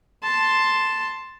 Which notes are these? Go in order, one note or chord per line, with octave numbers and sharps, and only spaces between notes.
A5 C6